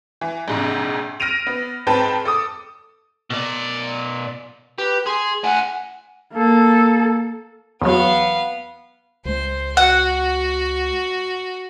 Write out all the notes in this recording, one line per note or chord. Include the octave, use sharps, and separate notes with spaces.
E3
A#1 G#2 C3
F6 A#6 D7 D#7 F7
B3
G#2 C4 B4 G5 A5
A4 D6 D#6
B2 D5
G4 B4
G#4 C6
A2 F#5 G#5
A#3 A4
E2 F#3 B3 F5
C#2 G#3 C5
F#4 F#5